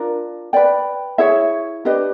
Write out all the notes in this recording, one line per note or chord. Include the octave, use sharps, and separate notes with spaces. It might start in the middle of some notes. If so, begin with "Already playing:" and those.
Already playing: D4 F4 A#4
B4 D5 G5
E4 G#4 C#5 E5
D4 G4 B4 D#5